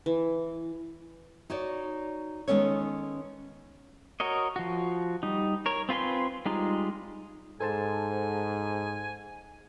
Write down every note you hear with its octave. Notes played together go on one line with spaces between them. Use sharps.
E3
D#4 F#4 C#5 D5
D#3 G#3 B3 C#4 A4 C#5
F#4 A#4 C#5 D#5
F3 F#4
G3 D#4
A#4 C#5
C4 F4 B4 G#5 C6
G3 G#3 D#4 F4
G#2 A4 C5 G#5 A5